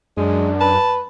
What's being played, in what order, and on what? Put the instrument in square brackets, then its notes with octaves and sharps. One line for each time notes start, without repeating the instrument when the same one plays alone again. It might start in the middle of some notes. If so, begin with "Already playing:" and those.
[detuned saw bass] F#2 [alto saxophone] G#3 [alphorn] D4
[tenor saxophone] B4 [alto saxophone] A5